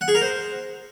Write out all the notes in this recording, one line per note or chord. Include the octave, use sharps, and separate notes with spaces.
F#5
G#4
A#4
C5